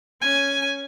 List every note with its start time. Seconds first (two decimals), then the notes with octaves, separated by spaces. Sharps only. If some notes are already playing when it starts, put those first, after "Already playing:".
0.22 C#4 G#5